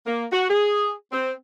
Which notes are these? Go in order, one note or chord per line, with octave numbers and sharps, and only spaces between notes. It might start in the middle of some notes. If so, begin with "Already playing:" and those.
A#3
F#4
G#4
C4